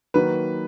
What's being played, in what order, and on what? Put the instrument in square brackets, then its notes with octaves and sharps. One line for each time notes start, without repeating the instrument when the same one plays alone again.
[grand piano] D#3 F#3 A#3 B4